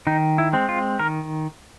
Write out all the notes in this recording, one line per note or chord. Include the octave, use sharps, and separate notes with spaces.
D#3 D#4
E4
G#3 C4
F4
D#3 A#4